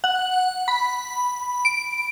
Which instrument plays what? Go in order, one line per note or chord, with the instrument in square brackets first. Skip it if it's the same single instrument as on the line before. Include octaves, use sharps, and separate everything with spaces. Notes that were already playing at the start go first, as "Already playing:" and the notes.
[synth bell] F#5
B5
D7